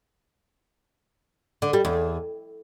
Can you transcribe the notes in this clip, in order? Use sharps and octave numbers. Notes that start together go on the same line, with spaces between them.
D3
G3
E2